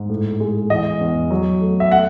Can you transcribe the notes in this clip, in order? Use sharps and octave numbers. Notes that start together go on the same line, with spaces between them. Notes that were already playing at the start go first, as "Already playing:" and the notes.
Already playing: G#2
A2
G#3
E3 D#5
E2
F#3
A3
E5
A3 F#5